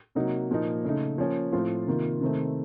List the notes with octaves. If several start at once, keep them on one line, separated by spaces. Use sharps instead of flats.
C3 F#3 A#3 D#4
A#2 F3 A#3 D#4
C#3 A3 D#4
F3 A#3 C#4
A2 F3 C4 F4
C3 D#3 A#3 F4
C3 D#3 A3 C4